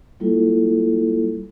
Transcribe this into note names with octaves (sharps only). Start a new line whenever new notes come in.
G3 A#3 E4 F4 A4